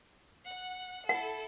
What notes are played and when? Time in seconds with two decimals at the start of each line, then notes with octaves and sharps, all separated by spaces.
0.49 F#5
1.09 E4 A4 F#5